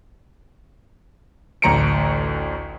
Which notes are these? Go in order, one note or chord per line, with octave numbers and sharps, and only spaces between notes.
A1 D2 A#5 C#7 D7